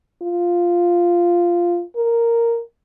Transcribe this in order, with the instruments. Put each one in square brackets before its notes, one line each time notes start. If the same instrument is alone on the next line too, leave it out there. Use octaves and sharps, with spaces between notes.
[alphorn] F4
A#4